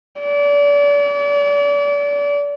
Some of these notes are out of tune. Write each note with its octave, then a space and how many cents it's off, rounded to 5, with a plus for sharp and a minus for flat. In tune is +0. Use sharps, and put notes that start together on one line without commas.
D5 -35